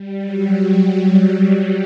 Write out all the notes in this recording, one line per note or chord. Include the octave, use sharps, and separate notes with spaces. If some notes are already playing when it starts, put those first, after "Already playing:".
Already playing: G3
F#3
G3
F#3